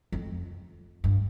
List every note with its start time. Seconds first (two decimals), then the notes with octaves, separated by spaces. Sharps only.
0.12 F2
1.04 G2